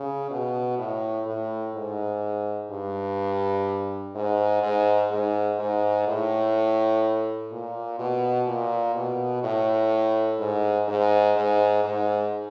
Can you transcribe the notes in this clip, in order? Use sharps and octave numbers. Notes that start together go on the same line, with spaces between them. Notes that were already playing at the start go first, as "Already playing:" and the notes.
Already playing: C#3
B2
A2
A2
G#2
G2
G#2
G#2
G#2
G#2
A2
A#2
B2
A#2
B2
A2
G#2
G#2
G#2
G#2